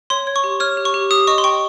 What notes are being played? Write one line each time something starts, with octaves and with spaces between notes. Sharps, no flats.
C#5 C6
C#5
C#6
G4
C#5 F6
G4
C#6
G4
G4 D#6
D#5 C#6
C6
G5 C#6